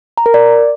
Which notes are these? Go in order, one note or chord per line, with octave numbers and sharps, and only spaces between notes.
A#5
A#4
D5